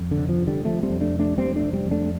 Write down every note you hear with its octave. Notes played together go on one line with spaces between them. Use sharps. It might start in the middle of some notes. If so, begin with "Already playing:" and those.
Already playing: F2
D3
C3
F3
C3
D3 G3
C3 F3 A3
G3 C4
F2
A3 D4
C3
A3 D4
F2 G3 C4
A3 D4
C3
G3 C4
F2
A3 D4